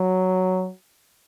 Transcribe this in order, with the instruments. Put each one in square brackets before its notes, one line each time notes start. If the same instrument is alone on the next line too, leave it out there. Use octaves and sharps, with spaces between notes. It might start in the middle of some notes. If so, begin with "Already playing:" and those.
Already playing: [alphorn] F#3